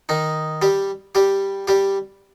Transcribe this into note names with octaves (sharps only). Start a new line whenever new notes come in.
D#3 D#4
G3 G4
G3 G4
G3 G4